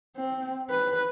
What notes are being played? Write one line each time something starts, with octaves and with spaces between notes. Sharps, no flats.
C4
B4